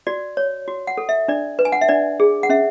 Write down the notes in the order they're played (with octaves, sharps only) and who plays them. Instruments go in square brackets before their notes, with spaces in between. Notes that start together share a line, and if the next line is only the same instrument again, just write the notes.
[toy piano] F#4 D5
C#5
F#4
F#5
A4
E5
D4 D5
B4
G#5
F#5
E5
D4 D5
G#4
F#5
C#4 E5